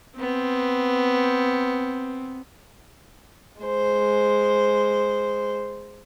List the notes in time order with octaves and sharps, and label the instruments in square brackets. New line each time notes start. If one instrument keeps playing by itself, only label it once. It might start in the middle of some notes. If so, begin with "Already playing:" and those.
[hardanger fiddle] B3 [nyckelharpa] C4
[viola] G#3 C5